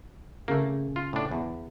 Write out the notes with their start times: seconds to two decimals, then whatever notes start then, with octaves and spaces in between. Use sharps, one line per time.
0.48 C#3 A3 A#3
0.96 F4
1.13 A2 D4
1.31 E2